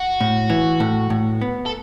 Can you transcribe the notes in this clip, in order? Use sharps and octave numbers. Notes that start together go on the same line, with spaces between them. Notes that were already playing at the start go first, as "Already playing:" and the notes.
Already playing: F#4
A2
E3
A2
A2
B3
A4